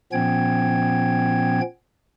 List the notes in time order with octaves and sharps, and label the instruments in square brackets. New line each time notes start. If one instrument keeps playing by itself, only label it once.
[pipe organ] A#2 F3 B3 C#4 G5 G#6